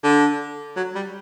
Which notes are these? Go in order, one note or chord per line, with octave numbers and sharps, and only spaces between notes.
D3
F#3
G3